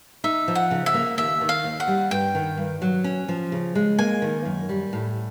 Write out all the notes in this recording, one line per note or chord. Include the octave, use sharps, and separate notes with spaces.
D#4 E5
F3
F#5
C#3
E5
A#3
D#2 E5
D#3
F5
D#2
F#5
G3
G2 G5
D#3
G2
F#3
C#4
F3
C#3
G#3
A#3 G#5
D#3
F#2
G3
A2